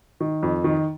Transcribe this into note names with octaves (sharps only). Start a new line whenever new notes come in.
D#3
F2
D#3